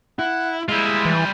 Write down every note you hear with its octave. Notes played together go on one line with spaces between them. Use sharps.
E4 F#5
G3 G#3 E4 F4
E3